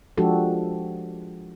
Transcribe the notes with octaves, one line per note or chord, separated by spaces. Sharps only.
F3 G#3 D4 F#4 G4 A4